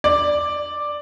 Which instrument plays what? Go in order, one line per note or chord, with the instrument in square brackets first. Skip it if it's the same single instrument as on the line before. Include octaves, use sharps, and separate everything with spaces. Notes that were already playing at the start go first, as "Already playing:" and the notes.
[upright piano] D5